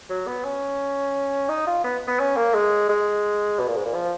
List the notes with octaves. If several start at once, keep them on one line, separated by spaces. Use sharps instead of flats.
F#3
B3
C#4
D#4
F4
B3
B3
C#4
A#3
G#3
G#3
B2
A#2
G#2
A#2
F3